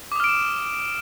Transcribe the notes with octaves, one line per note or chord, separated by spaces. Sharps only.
D6 D#6 F6 D7 E7